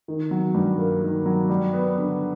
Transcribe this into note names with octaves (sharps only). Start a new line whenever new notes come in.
D#3
F#3
G2
A#3
D#3
F#3
G3
B3
D3